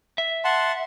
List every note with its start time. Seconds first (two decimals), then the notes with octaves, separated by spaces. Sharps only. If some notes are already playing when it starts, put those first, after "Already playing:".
0.18 E5
0.45 F#5 A5 C6